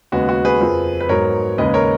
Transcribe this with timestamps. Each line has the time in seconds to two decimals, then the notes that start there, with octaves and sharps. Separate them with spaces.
0.12 D#2 C#3 G#3 B3 F#4
0.29 F#4
0.45 G#4 B4
0.61 F2 F3 A#3
1.00 B4
1.09 G#2 F#3 B3 A#4 C#5
1.58 D#2 C#3 G#3 D#4 B4 D#5
1.74 A#4 C#5